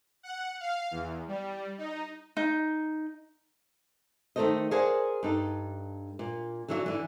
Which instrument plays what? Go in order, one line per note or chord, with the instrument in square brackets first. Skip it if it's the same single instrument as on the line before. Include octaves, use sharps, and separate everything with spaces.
[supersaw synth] F#5
F5
E2
G3
D#4
[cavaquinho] D#4
[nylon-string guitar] D#3 A3 D#4 A4 C5 D#5
G#4 A#4 C5 D5 F#5 G#5
G2 D#4 A4
A#2
D3 E3 F#3 C#5 D#5 E5
D3 E3